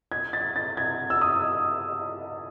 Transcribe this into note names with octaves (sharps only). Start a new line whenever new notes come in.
G#6
A6
A6
G#6
E6
D#6